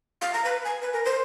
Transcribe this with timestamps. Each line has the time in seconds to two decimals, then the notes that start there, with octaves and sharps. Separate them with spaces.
0.21 F5
0.33 A#5
0.45 B4
0.65 G#5
0.82 B4
0.93 A#4
1.05 C5